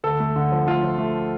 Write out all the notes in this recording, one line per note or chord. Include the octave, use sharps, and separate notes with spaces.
D2 A4
A3
D3
F3
A3 F4
F3
A3